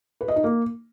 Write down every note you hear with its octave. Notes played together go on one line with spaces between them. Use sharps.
B4
D#5
D#4
A#3